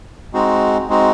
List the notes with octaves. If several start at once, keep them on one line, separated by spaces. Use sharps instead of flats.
G#3 C4 D#4 F#4
G#3 C4 D#4 F#4